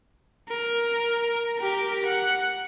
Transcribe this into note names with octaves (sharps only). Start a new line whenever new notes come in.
A#4
G4 A#4
F#5